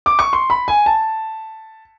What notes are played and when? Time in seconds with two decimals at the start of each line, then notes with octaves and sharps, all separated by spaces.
0.06 D6
0.19 C#6
0.33 C6
0.50 B5
0.68 G#5
0.86 A5